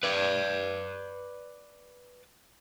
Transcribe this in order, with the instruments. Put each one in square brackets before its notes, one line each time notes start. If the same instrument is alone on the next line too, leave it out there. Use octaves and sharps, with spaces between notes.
[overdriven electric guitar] B4 D5